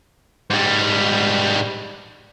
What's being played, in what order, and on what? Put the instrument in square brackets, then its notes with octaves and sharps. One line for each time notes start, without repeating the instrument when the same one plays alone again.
[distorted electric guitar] G#2 G3